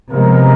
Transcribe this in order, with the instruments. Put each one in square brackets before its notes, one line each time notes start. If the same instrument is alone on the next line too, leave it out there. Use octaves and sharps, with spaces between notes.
[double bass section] C3 F3 G#3 B3 [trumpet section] A#4